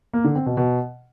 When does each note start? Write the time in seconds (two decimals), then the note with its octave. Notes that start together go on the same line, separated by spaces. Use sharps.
0.13 A#3
0.24 D3
0.35 C4
0.46 B2
0.57 B2